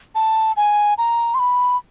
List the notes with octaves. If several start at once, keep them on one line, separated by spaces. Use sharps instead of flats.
A5
G#5
A#5
C6
B5